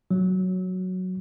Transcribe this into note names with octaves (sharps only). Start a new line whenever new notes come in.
F#3